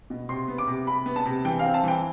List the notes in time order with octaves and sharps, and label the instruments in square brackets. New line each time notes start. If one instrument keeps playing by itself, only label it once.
[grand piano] B2
C3 C6
B3
D6
C3
C3 B5
B3
A5
C3
E3 G5
F5
C4
A5
E3 G5